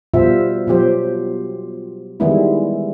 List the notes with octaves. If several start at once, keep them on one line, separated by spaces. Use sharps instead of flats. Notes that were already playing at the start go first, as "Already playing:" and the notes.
B2 F3 G3 F4 C5 E5
B2 F3 F#3 G4 C5
D#3 E3 G3 G#3 B3 E4